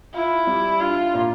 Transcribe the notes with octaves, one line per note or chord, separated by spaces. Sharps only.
E4 F4
G3
D4 F4
A#2